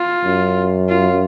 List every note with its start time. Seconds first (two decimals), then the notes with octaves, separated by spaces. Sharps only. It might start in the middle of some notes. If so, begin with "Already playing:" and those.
Already playing: F4
0.25 F#2
0.89 F4